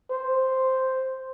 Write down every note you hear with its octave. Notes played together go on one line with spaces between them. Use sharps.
C5